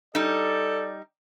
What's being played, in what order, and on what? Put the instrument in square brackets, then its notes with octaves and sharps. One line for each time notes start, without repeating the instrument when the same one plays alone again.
[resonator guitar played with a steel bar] G3 D#4 [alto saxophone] A4 [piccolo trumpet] D5